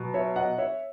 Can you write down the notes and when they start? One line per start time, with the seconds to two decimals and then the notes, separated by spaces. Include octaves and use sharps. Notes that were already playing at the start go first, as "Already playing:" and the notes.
Already playing: B2 F#3
0.14 C#5 E5
0.36 D#5 F#5
0.58 C#5 E5